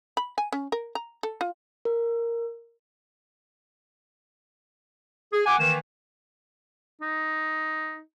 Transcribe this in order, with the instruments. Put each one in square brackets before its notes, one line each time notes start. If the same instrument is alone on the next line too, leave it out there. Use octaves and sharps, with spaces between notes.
[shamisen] B5
G#5
C#4
A#4
A#5
A4
F4
[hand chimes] A#4
[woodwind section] G#4
[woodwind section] F#5 G#5 [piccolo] D6
[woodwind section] D#3 E3 A#3 [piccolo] E7
[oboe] D#4